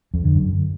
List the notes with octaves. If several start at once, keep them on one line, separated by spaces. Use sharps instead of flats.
F2
D3
F#2